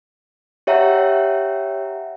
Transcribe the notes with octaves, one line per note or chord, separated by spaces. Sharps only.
G4 C#5 E5 F#5 G5 A#5